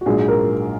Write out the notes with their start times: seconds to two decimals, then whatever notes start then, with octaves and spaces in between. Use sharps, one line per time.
0.01 F#4
0.06 A#1 G#2 F#3 G#4
0.28 A#4